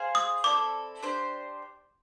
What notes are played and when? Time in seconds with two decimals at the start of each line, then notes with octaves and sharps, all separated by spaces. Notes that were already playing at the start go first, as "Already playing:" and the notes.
Already playing: G#4 C5 F5 G#5
0.15 D#6
0.44 C4 E4 A4 D5 D6
1.02 D4 G4 C5